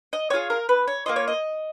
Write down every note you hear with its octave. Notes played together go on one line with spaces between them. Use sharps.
D#5
B3 F4 G#4 C#5
A#4
B4
C#5
A#3 C#4 F4 D#5
C#5
D#5